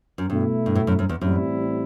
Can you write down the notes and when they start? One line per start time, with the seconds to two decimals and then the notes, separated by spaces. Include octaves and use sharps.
0.18 F#2
0.30 G2 B2 A3 E4
0.66 G2
0.75 A2
0.87 F#2
0.99 F#2
1.09 E2
1.21 A1 F#2 A2 G3 C4 E4